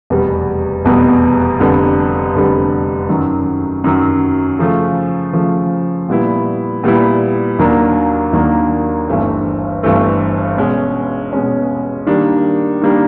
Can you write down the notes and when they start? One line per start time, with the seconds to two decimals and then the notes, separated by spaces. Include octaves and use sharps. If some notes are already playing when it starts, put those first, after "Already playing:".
0.10 F1 E2 B2 G3 B3
0.85 F1 E2 B2 G3 B3
1.60 F1 F2 D3 G3 B3
2.35 F1 F2 D3 G3 B3
3.09 F#2 D#3 F#3
3.84 F#2 D#3 F#3
4.59 C#3 F3 A3
5.33 C#3 F3 A3
6.09 A#2 G3 B3 E4
6.84 A#2 G3 B3 E4
7.59 D#2 D#3 F#3 A#3 D4
8.33 D#2 D#3 F#3 A#3 D4
9.08 G1 G2 E3 A3 C4
9.83 G1 G2 E3 A3 C4
10.57 B2 G#3 C#4
11.33 B2 G#3 C#4
12.07 D#3 G3 A#3 D4
12.81 D#3 G3 A#3 D4